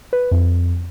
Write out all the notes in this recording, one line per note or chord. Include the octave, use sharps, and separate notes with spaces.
B4
F2